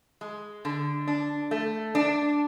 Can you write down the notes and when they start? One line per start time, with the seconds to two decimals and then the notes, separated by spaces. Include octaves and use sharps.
0.21 G#3
0.65 D3
1.07 D4
1.51 A3
1.95 D4